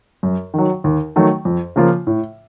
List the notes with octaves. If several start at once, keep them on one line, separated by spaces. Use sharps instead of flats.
F#2
D#3 F#3
D#2
D#3 F#3 A3
F2
C#3 F3 A#3 F4
A2